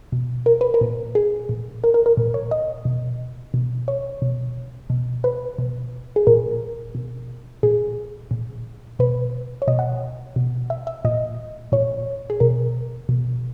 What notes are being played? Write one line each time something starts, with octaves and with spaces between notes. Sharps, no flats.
B2
A#4
B4
A#4
A#2
G#4
A#2
A#4
A#4
A#4
A#2
C#5
D#5
B2
B2
C#5
B2
B2
B4
B2
G#4
A#2 A#4
B2
A#2 G#4
A#2
B2 B4
C#5
B2 D#5
F#5
B2
E5
E5
A#2 D#5
A#2 C#5
G#4
B2 A#4
B2